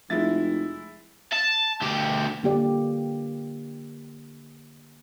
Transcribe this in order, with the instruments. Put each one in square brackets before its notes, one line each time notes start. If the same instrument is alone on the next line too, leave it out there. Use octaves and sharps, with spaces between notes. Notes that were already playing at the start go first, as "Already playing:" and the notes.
[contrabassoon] F1 [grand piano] G#3 E4 A6
[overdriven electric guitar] A5
D2 G4
[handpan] D3 A#3 G4 D5